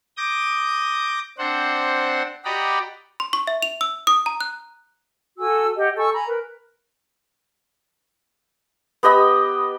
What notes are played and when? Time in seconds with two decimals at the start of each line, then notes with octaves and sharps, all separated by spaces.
0.17 D6 D#6 G6 A#6
1.38 C4 D4 C5 F#5
2.45 F#4 G4 D5 D#5 A#5 B5
3.20 C6
3.33 C#6
3.47 E5
3.62 F7
3.81 E6
4.07 D#6
4.26 A#5
4.41 F#6
5.39 F#4 A4 G#5 E6
5.78 G4 D#5 F#5
5.97 A4 G#5 C#6 E6
6.13 G#5 A#5 B5
6.28 A#4 B4
9.03 B3 G4 D#5 B5